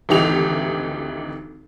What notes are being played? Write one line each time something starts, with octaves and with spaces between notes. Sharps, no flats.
G#1 D2 E3 D#4 G4 F7